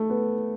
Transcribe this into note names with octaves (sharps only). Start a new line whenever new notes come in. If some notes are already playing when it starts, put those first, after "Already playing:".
Already playing: A3
B3